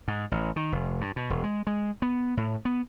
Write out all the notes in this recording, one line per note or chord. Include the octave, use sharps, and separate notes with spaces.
G#2
A1
D#3
F1
G2
B2
E1
G#3
G#3
B3
A2
B3